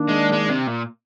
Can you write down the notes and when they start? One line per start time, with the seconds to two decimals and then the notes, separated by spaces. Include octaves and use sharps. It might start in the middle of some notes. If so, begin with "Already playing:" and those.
Already playing: D#3 A#3 D4
0.08 G#3
0.32 G#3
0.49 C3
0.67 A#2